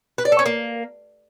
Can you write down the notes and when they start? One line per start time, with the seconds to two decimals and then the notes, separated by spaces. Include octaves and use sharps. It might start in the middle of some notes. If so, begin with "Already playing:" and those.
0.18 B4
0.25 D5
0.32 A4
0.39 C#4
0.46 A#3